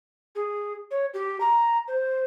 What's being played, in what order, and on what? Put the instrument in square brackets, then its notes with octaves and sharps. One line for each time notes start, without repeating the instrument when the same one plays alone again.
[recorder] G#4
C#5
G4
A#5
C5